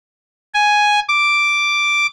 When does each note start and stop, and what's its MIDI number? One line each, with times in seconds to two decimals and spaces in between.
0.54 1.00 80
1.08 2.07 86